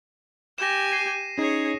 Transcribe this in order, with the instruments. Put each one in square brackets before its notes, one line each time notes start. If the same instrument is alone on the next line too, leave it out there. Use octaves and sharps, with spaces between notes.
[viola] G4 G#5 [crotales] A#6 E7
[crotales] C7 D#7
[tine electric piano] C#4 D#4 [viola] G#4 C#5